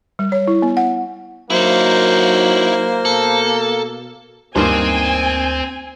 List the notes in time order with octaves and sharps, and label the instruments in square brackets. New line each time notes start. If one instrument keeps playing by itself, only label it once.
[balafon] G3
C#5
E4
B3
F#5
[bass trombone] F#3 [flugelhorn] A#3 [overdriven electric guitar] D#4 E4 [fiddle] C5
[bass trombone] B2 [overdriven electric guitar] A4
[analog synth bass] D2 [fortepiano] G2 D#3 A#3 [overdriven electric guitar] C4 C5 [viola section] G#5